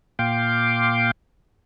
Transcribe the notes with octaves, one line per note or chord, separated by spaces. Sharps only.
A#2 F5 G5 C6 D6